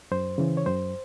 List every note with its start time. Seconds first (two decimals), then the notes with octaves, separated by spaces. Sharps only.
0.11 F#2 C5
0.38 C#3 E3
0.57 C#5
0.66 F#2 C5